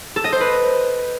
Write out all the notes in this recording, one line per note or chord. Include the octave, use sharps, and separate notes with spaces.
A4
D#5
C5
B4